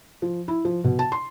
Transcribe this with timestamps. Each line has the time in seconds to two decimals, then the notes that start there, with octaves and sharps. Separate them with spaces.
0.22 F3
0.48 E4
0.65 F3
0.84 B2
0.99 A5
1.12 C6